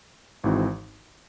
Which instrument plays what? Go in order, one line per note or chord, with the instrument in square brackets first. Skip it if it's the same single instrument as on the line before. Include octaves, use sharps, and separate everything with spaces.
[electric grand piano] G#1 G#2 E3 C4 F#4